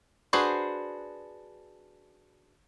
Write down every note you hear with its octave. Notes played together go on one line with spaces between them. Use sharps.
D4 F#4 G#4 B4 C5